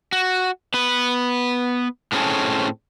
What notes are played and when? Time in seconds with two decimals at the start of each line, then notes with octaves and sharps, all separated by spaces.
0.12 F#4
0.74 B3 B4
2.12 A2 F#3 C4 C#4 G#4 A4